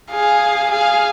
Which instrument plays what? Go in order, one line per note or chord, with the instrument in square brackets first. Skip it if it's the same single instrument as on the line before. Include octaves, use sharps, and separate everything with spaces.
[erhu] G#4 [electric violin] F5
[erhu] G#4 [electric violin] F5